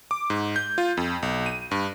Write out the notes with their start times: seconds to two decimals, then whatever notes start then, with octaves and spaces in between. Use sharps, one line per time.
0.11 D6
0.30 G#2
0.56 G6
0.78 F4
0.97 F2
1.22 B1
1.46 D#7
1.71 G2